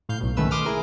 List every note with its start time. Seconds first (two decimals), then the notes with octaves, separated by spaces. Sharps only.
0.09 A2 F5 G6 C7
0.20 B1 B2
0.37 G#1 D#3 A3 C#4 B4 E6
0.51 C6 D6 D#6 F6
0.66 E4 G#4 A#4